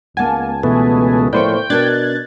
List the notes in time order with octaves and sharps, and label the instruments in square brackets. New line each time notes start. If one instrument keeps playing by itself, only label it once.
[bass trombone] C#2 [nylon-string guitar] A#3 F#5 [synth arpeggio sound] G#5 A5
[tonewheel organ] B2 A3 B3 [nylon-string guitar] E3
[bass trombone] A2 [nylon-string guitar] F3 A#3 D5 [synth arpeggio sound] B4 C5 C#6 [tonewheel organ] G5
[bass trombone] B2 [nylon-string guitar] D4 A#4 A5 [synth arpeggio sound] F#6 G#6 A6